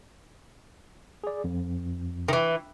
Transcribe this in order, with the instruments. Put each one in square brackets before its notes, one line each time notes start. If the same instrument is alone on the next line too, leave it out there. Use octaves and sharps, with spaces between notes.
[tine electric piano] G#4 D5
F2
[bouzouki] D#3 E3 [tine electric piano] E5